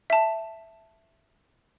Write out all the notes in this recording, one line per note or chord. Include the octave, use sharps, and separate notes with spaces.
E5 A5